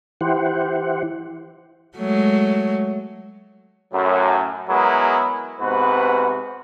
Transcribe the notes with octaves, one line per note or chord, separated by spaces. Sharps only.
E3 E4 G4 C5 F#5
F#3 G#3 A3
F#2 A2 F#3
F#3 G#3 B3 E4 G#4 A#4
G#2 C3 B3 F#4 B4